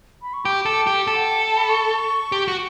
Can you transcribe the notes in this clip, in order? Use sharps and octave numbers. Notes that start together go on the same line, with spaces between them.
B5
C#6
G4 D6
A4
G4
A4
F#5
G5
A5
B5
C#6
G4
F#4